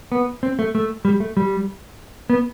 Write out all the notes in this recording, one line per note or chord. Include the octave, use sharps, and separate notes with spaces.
B3
C4
A3
A3
G3
A3
G3
B3